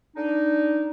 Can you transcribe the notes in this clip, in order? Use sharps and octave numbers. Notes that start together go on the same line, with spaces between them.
D4 D#4